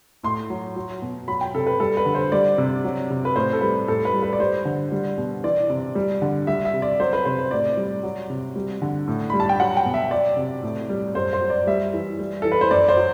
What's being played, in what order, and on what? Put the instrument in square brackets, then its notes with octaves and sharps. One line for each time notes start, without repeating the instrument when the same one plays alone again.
[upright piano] A2 C6
F#3
F#3
B2
F#3 B5
G5
C3 A4
B4
G3 A4
B4
D3
C5
G3 D5
C3
F#3
C3
B4
A2 C5
A4
G3 B4
A2 A4
B4
G3
B4
D5
G3 C5
D3
G3
B2
E3 D5
C3
G3
D3
G3 E5
E5
C3
D5
F#3 C5
B4
C3 C5
C5
A2 D5
G3
F#3
C3
G3
D3
A2
G3 B5
A5
G5
F#3 F#5
G5
B2
E5
F#3 D5
C3
A2
G3
F#2 C5
C5
F#3
D5
G3 E5
E3
G3
E3 A4
B4
C5
F#2 D5
C5
F#3